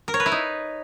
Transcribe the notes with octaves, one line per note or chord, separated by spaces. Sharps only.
A#4
C#5
B4
E4
D#4